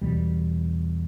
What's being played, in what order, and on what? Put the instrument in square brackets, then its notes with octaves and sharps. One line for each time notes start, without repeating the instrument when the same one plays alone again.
[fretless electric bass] E2 B2 G3